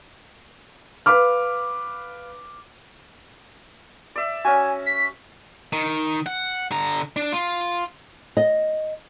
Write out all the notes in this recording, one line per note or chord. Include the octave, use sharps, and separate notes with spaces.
B4 F5 B5 D6 F6
D5 E5
C#4 F#4 G#5
B6
D#3
F#5
D3 A#5
D4
F4
D#5